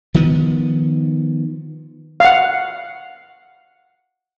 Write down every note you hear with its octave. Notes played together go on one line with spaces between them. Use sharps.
D#3 F3 B3
F5 F#5